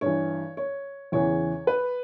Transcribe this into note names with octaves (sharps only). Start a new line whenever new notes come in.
G2 E3 C#5
C#5
E2 C#3 E3 C#5
B4